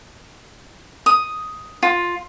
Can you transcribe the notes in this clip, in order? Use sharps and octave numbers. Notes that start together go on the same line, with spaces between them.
D#6
F4